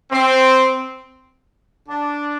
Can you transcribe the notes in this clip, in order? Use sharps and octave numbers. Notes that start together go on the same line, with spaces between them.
C4
D4